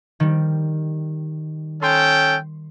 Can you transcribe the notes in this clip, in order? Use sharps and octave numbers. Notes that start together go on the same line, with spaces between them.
D#3 G3
C#4 A4 G5 C6